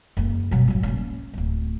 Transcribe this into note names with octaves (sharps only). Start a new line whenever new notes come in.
F#1 A#3
B2 F#3
A1 F#3
A#3 C#4
D1 F#3